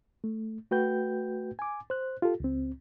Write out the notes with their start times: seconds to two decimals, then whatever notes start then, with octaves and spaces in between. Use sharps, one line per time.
0.24 A3
0.71 A3 F#4 B4 G5 G6
1.59 G#5 D6
1.90 C5 F#6
2.22 F4 G4 A4
2.40 C#2 C4